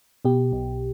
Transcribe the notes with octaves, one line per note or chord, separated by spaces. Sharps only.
B2 G4
B1